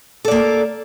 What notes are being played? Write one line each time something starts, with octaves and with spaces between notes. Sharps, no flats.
A#3 A4 D5